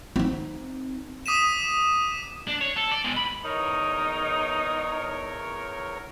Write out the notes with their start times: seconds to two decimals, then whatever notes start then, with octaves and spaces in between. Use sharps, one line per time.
0.16 C4 D#4
1.26 D6 D#6 B6 D#7 E7
2.47 D4
2.61 C#5
2.76 A4
2.91 D5
3.04 B2 G#3
3.16 B5
3.44 E2 D#4 A#4 C#5